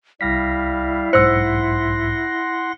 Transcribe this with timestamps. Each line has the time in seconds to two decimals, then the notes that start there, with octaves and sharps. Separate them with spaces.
0.21 C2 G3 E4 F5 A#6 B6
1.13 B1 G#2 C5 F#5 C6 E6 A#6 C#7